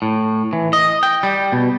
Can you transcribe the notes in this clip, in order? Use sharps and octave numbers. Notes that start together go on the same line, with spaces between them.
A2
E3
D#5
G5
G3
B2